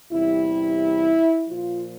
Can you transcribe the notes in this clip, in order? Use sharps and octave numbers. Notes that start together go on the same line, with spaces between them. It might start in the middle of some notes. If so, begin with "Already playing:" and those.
E2 C3 G3 E4
A#2 F3 F4